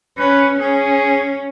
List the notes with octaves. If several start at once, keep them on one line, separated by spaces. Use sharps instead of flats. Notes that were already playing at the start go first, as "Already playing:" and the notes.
C#4 B4
C#4 G#4